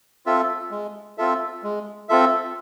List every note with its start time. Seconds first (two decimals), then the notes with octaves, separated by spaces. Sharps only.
0.26 C4 F4 A4 E5
0.71 G#3
1.18 C4 F4 A4 E5
1.63 G#3
2.09 C4 F4 A4 E5